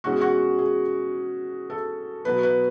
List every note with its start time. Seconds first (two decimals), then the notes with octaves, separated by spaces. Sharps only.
0.04 B2 G#3 C#4 F#4
0.12 G#4
0.21 F#4
0.59 G#4
1.70 A4
2.25 B2 F#3 B3 B4
2.43 B4